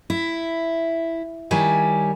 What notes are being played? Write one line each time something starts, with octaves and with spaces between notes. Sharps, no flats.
E4
D#3 G3 E4 C#5 G#5